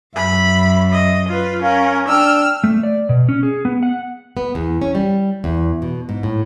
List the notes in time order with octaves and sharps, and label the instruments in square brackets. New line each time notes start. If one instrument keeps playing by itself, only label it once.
[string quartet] F#2 [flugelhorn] E5 [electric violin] B5
[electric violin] D#5
F4 B4
[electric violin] C#4 A#4 [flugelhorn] F5
[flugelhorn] D4 [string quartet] G5 [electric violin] E6 F6
[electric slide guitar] A3
D5
B2
C#4
G#4
B3
F#5
[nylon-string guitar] B3
E2
C#4
G3
E2
B2
G#2
A2